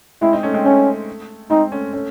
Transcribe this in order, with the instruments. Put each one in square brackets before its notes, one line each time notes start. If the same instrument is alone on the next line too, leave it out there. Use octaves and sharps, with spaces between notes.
[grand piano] G#3 C4 [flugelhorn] E4
[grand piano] C4 D#4
A3 C#4
G#3 C4
[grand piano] A3 [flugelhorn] C#4
[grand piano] G#3 C4 [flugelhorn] D#4
[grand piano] A3 C#4
A3 C#4